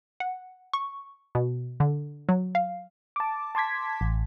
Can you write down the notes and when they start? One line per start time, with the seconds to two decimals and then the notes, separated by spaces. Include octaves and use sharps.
0.20 F#5
0.73 C#6
1.35 B2
1.80 D3
2.29 F#3
2.55 F5
3.16 A5 D6
3.55 A5 C6 D6 G#6 B6
4.01 A1